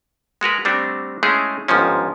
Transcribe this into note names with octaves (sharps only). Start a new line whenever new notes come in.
G#3 F#4 A#4 B4
G3 A3 C4 D4 F#4
G#3 A3 C#4 D#4 E4 G#4
G1 G#2 D#3 F3 C#4